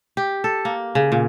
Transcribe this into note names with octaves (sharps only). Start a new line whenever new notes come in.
G4
A4
A#3
C#3
A#2